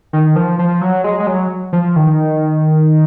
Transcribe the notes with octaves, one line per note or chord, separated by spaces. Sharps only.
D#3
F3
F3
F#3
G#3
G#3
F#3
F3
D#3